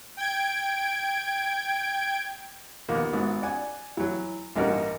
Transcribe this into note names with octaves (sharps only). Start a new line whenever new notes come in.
G5 G#6 D7
D#2 F3 A#3 B3
G#1 G#2 B3
D5 F#5 G#5
E3 F#3
A1 G2 A#3 D#4 F#4 A#4